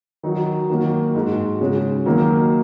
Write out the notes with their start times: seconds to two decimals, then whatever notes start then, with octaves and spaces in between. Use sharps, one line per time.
0.23 D#3 F#3 D#4 F#4
0.70 D#3 F#3 A#3 F#4
1.15 G#2 G#3 F#4
1.61 C#3 G#3 C#4 F#4
2.06 D#3 F#3 A#3 D#4